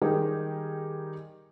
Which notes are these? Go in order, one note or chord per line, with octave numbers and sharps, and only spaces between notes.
D#3 G3 D#4 G4 G#4 A#4